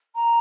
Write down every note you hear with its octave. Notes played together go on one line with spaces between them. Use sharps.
A#5